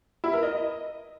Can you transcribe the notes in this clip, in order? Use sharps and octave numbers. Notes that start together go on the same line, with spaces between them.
E4
A#4
D#5